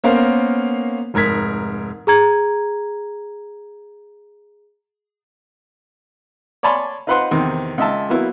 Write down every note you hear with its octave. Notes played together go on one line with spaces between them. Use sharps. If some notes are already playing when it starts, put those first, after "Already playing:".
A#3 B3 C#4 A#4 C5 F5
F1 G#2 A#4 G#6 B6
G#4 A#5 G#6
C#5 D5 G#5 A5 B5 C6
D#4 F4 B4 C5 F#5 C6
E2 C3 D#3 C4
C#2 D#5 E5 A5
F#3 A#3 B3 E4